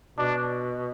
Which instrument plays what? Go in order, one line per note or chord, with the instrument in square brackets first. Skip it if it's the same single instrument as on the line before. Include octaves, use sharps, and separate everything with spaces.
[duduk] B2 [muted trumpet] D4